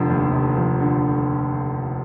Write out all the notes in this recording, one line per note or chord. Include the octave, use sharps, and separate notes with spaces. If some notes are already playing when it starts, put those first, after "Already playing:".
Already playing: F1 D3 F3
D#2
F1
F3
D3